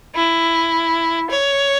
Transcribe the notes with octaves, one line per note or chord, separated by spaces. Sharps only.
E4
C#5